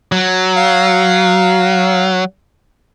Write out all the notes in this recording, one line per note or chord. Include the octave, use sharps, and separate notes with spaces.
F#3
F5